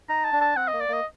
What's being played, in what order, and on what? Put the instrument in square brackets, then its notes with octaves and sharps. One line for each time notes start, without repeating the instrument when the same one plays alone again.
[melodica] D#4 [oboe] A#5
[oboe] A5
[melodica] D4
[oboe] A5
[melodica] C4 [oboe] F#5
[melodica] A#3 [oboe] D#5
[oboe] D5
[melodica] A#3 [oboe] D#5